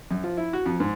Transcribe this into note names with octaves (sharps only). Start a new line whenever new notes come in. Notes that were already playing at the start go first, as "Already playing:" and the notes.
F#2
F3
E4
F#4
F2
G#2